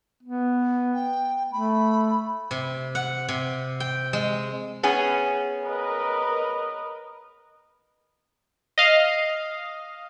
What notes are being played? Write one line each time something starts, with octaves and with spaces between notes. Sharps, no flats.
B3
G5
A3 B5
C3
F#5
C3
G5
G#3
B3 C#4 G#4
A#4 B4 D#5
D#5 F5